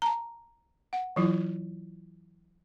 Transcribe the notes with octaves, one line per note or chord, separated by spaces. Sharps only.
A5 A#5
F#5
E3 F#3 E4 F4